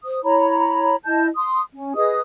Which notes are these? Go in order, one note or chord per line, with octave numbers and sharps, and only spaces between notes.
C5 D#6
E4 C#5 A#5 B5
E4 D#5 A5 G6
C6 D#6
C#4
G#4 B4 D#5 D#6